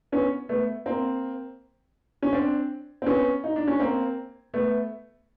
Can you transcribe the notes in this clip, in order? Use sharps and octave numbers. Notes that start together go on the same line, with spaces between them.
B3 C#4
A3 B3
A#3 C4
C#4
C4 D4
C4
B3 C#4
D#4
D4
C#4
A#3 C4
A3 B3